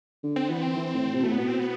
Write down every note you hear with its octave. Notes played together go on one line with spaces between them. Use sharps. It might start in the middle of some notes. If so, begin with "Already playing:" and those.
D3
C4
E3 B3
C4
E3
A2
C3
B2 A3
A2 B3
B2
C4
B3